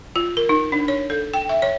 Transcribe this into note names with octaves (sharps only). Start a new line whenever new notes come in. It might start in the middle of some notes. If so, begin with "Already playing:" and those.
F4
A#4
D#4
D4
C#5
A4
G5
E5
C#5